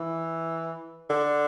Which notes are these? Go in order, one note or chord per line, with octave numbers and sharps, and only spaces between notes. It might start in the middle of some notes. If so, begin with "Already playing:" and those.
Already playing: E3
D3